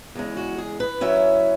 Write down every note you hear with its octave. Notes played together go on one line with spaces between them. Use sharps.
E2 C#3 G#3
F#4
G#4
B4
F#2 F#3 C#4 E4 E5